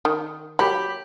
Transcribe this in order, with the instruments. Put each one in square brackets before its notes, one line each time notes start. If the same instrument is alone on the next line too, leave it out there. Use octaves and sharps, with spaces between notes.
[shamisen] D#3
[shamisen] F#3 [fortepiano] G4 B5